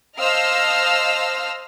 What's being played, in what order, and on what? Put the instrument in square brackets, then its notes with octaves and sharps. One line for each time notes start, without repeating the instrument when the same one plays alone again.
[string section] C5 D#5 F5 A5 E6 F6